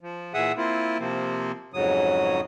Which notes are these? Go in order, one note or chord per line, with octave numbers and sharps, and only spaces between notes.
F3
A#2 E3 G#4 E5 F#5 D#6
A#3 C4 E4 F4
C3 F3 A#3 C4
F2 G#2 C#3 F#3 D#6